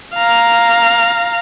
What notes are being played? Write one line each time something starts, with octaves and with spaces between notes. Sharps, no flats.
F5 A#5